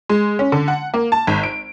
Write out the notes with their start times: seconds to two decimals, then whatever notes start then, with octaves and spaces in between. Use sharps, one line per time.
0.09 G#3
0.39 C#4
0.52 D3
0.68 F#5
0.94 A#3
1.12 A5
1.27 G#1
1.43 D7